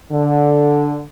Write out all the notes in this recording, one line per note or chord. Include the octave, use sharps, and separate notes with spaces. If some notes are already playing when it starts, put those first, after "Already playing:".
D3